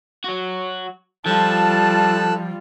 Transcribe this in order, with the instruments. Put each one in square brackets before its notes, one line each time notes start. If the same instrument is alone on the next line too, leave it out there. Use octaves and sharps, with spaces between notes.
[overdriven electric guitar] F#3 F#4
[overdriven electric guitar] F3 [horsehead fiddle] G3 F4 [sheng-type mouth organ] A4 E6 F#6 [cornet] A5